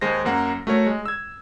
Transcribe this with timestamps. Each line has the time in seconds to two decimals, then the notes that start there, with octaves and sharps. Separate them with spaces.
0.01 D#2 G#3 C5 A#6
0.25 F#2 A#3 F#5 A#5
0.67 A3 F#4 A#4 C#5
0.86 G#3
1.06 E6 G#6